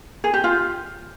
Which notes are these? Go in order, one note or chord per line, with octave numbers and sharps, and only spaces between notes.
G#4
G4
F4